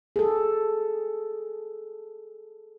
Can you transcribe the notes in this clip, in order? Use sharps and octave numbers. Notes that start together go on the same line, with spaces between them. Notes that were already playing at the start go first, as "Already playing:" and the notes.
G#4 A4